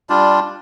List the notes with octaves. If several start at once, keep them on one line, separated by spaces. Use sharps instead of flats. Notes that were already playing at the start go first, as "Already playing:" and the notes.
G3 D4 F4